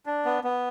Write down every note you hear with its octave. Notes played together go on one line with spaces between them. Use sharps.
D4
B3
B3